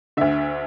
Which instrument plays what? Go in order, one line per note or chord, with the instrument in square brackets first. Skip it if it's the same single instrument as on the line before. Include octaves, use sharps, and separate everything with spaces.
[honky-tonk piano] D2 D3 E5